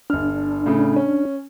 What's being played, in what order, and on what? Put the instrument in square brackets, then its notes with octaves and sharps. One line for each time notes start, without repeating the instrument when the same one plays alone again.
[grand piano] G1 F6 [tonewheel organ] D4
[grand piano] A2 C#3
C#4